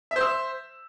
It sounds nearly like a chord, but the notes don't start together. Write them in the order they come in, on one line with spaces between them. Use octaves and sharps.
E5 C5 E6